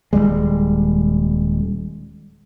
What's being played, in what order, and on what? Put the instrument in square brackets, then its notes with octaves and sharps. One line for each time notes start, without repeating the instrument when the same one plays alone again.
[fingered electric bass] D#1 G2 G3 G#3